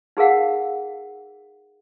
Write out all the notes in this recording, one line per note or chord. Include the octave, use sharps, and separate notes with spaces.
D#4 G#4 A#4 F5 F#5